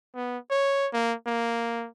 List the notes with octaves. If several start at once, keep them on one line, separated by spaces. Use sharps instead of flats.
B3
C#5
A#3
A#3